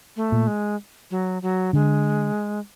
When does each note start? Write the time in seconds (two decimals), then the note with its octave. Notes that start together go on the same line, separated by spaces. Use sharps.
0.16 A3
0.32 A#2
0.47 G#3
1.11 F#3
1.42 F#3
1.73 D3 G#3